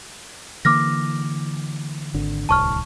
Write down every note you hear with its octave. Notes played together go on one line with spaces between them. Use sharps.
D3 E3 A#3 D6 F6 A#6
G#1 D3
D1 C2 A5 C#6 F6